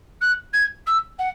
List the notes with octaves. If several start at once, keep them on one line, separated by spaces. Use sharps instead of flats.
F#6
G#6
E6
F#5